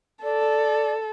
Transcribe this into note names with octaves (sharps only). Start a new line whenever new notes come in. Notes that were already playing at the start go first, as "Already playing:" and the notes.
A4 D5